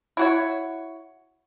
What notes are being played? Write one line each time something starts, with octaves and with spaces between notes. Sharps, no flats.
E4 F#4 C#5